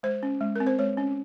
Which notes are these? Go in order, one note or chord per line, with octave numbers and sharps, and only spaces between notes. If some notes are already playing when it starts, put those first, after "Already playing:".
G#3 C5
C#4
G#3
C4 A#4
C5
G#3 C#5
C#4